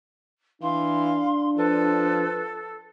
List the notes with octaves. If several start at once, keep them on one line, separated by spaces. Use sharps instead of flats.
E3 D4 F5 C6
F3 A4 B4